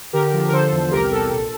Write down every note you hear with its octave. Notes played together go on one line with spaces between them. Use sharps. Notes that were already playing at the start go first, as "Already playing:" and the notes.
D3 G4 A#4
F3
A#4
D3 A4 C5
E2
C2 G4 A#4
C2 A4
A#1